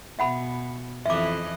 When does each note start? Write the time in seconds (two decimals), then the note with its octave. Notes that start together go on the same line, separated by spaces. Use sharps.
0.19 B2 E5 F#5 B5
1.06 F2 E3 D#5 E5 D6